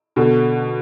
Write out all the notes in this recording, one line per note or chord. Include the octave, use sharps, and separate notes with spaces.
B2 D3